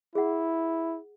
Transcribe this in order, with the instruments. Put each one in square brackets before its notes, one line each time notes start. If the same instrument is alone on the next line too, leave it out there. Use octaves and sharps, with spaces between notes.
[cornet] E4 [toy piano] G#4 F#5